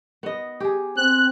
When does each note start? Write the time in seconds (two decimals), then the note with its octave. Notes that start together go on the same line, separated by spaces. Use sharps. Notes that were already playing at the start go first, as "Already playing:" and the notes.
0.23 B3 D#5
0.60 G4 G#4
0.97 C4 F#6